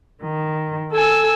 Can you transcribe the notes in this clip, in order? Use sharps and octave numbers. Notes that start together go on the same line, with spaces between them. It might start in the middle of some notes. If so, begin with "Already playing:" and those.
D#3
A4 G#5 E6